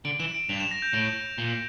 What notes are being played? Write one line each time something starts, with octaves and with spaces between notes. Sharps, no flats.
D3 D7
E3 E7
D7
G2 F7
E7
A#6
G6
A2 D7
A#2